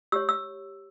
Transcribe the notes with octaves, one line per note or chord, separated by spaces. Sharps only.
G4 C#5 E6
E6